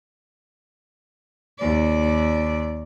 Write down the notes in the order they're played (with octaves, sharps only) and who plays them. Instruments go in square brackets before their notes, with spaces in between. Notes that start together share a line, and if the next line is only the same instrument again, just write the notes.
[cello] D#2 D5